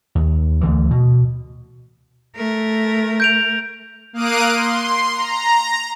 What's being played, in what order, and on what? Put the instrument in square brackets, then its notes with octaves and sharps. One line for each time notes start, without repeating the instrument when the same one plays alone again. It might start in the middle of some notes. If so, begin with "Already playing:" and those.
[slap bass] D#2
D2 D3 E3
B2
[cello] A3 A#4
[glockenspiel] G6 D7 F7
[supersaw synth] A#3 F5 D#6 F#6 D7 D#7
C6
A#5